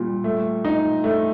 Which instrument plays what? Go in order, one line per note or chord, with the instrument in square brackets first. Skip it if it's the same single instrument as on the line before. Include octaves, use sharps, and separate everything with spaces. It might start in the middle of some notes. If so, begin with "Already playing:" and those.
Already playing: [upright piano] A#2 G3
A3
D#4
A3